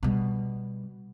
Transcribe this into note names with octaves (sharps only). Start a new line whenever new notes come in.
B2 G3